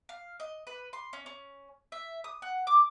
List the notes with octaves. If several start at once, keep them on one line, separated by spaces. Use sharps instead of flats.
F5
D#5
B4
C6
C#4
C#4
E5
D#6
F#5
D6